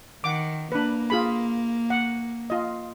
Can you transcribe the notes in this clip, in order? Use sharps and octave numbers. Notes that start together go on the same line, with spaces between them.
D#3 F#5 D6
A#3 D4 B4
F4 G#4 B5
F#5
F4 D#5